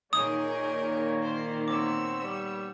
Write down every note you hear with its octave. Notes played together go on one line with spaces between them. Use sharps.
A#2 D#3 A#3 D#4 G#4 A#4 C#5 D#6
C5
B3 C4 C#5 D6 E6
G3